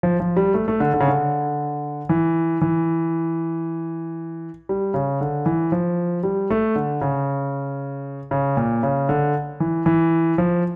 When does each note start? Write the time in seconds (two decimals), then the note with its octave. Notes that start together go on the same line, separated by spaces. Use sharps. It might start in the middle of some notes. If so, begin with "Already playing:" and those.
0.03 F3
0.20 F3
0.37 G3
0.54 A3
0.68 A3
0.80 D3
0.94 D3
1.00 C#3
1.08 D3
2.09 E3
2.61 E3
4.69 G3
4.94 C#3
5.21 D3
5.46 E3
5.72 F3
6.23 G3
6.50 A3
6.76 D3
7.01 C#3
8.31 C#3
8.57 A#2
8.83 C#3
9.09 D3
9.60 E3
9.86 E3
10.38 F3